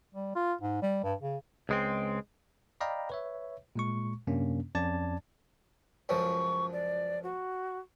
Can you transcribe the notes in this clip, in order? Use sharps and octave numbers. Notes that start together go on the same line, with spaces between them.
G3
F4
G#2
G3
G2
C#3
C#2 G#3 C4
D5 D#5 F5 G5 A#5 B5
B4 C#5 E5
A#2 G#3 C#6
F#2 C3 A#3 C#4 D4
F2 C#4 D5 A5 G#6 A6
C#2 F#2 F3 C#6
D5
F#4